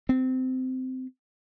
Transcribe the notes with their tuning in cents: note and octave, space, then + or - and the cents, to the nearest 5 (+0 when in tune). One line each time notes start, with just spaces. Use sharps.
C4 -20